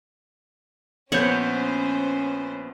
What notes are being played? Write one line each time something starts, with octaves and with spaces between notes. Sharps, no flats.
A#1 B3 C#4 C5 C#5 F#5 G6